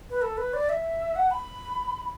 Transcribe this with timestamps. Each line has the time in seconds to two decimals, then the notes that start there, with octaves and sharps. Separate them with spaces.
0.10 B4
0.22 A4
0.37 B4
0.53 D5
0.69 E5
1.16 F#5
1.31 B5